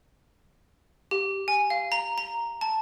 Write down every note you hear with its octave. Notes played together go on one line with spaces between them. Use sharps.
G4
G#5
F5
A#5
A#5
A5